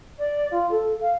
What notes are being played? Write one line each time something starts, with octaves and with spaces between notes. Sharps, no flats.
D5
F4
A4
F5